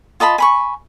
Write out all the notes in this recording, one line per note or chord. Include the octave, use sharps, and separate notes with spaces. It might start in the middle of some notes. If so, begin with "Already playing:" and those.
F4 D#5 A5 B5
G#5 B5 C#6